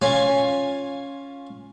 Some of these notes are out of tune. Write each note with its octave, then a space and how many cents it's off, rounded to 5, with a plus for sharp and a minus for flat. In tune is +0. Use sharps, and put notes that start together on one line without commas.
C#4 +0 F4 +10 G#5 -5